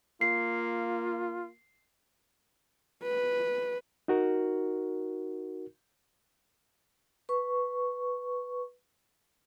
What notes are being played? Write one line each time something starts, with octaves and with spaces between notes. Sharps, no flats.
A#3 F4 C7
B4
D#4 F#4 A#4
B4 C#6